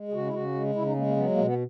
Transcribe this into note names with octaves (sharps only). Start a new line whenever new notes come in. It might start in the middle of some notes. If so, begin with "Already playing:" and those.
Already playing: G#3
G#4
C#3 F#4
E4
C#3 F#4
G#3
C#3 E4
D#4
G#3 A#3
A#3
F#3 B3
A#3
B2
B3